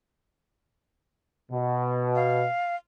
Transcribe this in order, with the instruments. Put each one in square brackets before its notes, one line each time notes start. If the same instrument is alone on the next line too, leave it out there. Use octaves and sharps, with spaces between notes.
[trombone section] B2
[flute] F5